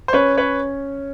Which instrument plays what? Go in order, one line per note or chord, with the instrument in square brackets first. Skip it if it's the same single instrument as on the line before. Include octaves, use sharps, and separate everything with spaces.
[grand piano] C5
[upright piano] C#4 [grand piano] B4 C#5
[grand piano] B4 C#5